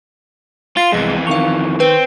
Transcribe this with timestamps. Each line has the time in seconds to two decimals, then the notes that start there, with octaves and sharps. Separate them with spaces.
0.77 F4 A6 C7
0.92 C2 F2 E3 G#3
1.27 D#3 F5 C#6 F7
1.80 C4 B4 G5